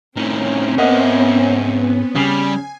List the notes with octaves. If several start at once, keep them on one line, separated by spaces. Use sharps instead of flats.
A2 D#3 C4 C#4
G#2 A#3 B3 D#5 E5 F#5
C#3 G3 G#5 C7